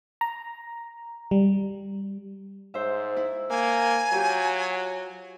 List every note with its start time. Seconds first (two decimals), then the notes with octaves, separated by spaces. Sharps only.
0.21 A#5
1.31 G3
2.74 G#2 C5 E5
3.17 E4
3.50 A#3 G#5
4.12 F#3 F4 G4